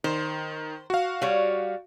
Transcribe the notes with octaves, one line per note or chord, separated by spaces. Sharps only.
D#3 C5
F#4 F5
G3 C#5